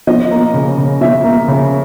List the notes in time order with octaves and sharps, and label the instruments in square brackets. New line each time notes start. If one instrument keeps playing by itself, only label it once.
[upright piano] F3 D#5
A#3
C#3
C#3
F3 E5
A#3
C#3